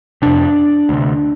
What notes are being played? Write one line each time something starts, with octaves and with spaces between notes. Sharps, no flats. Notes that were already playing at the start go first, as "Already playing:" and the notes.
F2 C3 D4
D2 C3